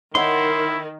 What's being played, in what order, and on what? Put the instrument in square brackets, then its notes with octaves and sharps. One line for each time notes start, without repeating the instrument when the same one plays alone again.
[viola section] D#3 [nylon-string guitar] D#4 C#5 F#5 [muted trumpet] E4 [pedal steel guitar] C6